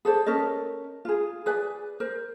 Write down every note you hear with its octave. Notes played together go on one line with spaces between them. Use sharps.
G#4 A4 C5 D5
C#4 A4 A#4 D#5
F4 G#4
G#4 B4 D5 G#5
A#4 C5